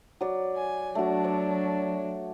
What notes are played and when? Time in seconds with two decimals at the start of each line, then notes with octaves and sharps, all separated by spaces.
0.21 F#3 D5
0.56 G#5
0.95 F#3 A3 D4 F#4
1.24 C#5 D5